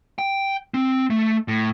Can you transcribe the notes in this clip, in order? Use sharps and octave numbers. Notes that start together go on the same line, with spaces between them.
G5
C4
A3
A2